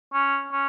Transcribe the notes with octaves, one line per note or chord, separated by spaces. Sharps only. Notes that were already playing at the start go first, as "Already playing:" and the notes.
C#4
C#4